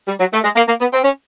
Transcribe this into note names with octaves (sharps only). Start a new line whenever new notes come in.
G3
F#3
A3
G#3
A#3
A#3
B3
C4
C#4